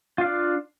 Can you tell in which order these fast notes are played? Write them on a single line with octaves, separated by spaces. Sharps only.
F4 F5 D4